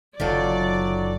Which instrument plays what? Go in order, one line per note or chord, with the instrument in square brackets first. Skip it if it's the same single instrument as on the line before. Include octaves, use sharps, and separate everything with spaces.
[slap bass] F#1 F#2 D3 [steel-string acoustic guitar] D#3 F4 A4 [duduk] F#3 [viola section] D5